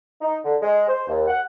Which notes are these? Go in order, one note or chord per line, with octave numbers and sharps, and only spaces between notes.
D#4
D3
G#3
C5
D#2
F#5